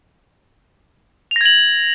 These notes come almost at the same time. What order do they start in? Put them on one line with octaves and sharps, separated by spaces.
F7 A#6 G#6 F#7